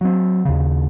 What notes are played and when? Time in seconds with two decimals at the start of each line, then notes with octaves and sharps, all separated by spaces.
0.01 F#3 C4
0.45 D#2 C#3